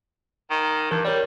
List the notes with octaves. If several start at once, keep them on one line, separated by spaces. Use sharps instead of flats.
D#3
G2 E3 A#4
G3 A#4 C#5 D5